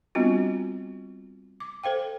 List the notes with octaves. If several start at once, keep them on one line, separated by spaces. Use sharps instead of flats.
G3 B3 C4 D4 F4 F#4
D6
A4 C5 F5 G5